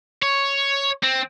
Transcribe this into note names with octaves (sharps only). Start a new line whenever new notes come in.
C#5
C4